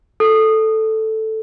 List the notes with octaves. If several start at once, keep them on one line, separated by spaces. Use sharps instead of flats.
A4